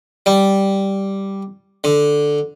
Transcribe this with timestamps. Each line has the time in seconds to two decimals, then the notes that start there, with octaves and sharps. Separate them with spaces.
0.26 G3
1.84 D3